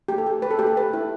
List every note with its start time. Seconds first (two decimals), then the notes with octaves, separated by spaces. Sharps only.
0.08 A3 G4
0.18 A4
0.27 G4
0.42 A3 B4
0.51 A4
0.59 A3 G4
0.67 A4
0.77 G4 B4
0.93 E4